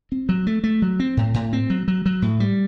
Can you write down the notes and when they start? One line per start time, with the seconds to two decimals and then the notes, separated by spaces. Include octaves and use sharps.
0.12 C4
0.29 F#3
0.47 A3
0.64 A3
0.82 F#3
1.00 C4
1.17 A2
1.34 A2
1.53 C4
1.70 F#3
1.88 F#3
2.06 F#3
2.22 A2
2.40 G3